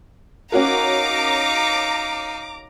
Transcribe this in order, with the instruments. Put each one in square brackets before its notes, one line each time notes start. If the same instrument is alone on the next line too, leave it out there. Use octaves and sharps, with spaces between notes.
[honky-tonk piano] C#4 F#4 A#4 [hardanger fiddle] D#4 F5 [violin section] A#5 D6